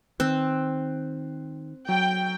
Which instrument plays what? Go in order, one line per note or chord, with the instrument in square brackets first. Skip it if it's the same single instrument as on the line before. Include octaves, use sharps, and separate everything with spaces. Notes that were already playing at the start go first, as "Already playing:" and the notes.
[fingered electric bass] D#3 [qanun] C4 [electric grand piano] F#6
[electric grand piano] F#3 [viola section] G5